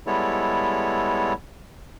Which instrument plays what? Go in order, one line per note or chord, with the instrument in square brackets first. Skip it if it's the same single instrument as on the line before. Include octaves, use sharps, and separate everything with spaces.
[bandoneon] G3 G#3 B3 E4 A4 C#5